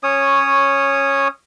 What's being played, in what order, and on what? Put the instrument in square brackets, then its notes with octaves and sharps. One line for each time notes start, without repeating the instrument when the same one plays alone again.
[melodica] C#4 C#5 D#6